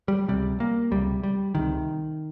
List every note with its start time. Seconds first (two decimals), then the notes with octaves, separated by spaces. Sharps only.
0.08 G3
0.28 C#2 C3 G3
0.60 A#3
0.91 C#2 C3 G3
1.23 G3
1.55 C#2 C3 D#3